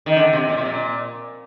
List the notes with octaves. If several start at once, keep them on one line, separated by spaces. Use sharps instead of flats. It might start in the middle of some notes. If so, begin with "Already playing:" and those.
D#3
D3
C3
A#2
C3
A#2